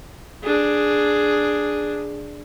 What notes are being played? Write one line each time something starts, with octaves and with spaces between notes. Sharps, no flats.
D4 G#4